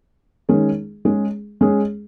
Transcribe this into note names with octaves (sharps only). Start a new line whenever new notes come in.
D#3 G#3 C#4 G#4
G#3 C#4 G#4
G#3 C#4 G#4